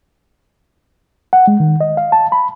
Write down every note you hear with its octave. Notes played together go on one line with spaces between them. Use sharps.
F#5
G#3
D#3
D#5
F5
A5
B5